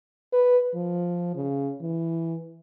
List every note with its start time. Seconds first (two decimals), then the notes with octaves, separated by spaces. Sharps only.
0.33 B4
0.74 F3
1.35 C#3
1.81 E3